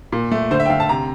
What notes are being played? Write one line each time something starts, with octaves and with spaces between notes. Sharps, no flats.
A#2
A3
D3 C5
E5
G5
D3 F5
A5
C3 A#5